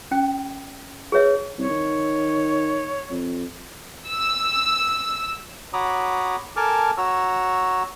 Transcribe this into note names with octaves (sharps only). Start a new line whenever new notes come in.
C#4 G5
G#4 B4 C#5 E5
C2 C#5
D#3
F2
E6
F#4 C#5 A#5 B5 D6 D#6
A4 A#4 G#5 A5 D6 F6
F#4 C#5 A#5 E6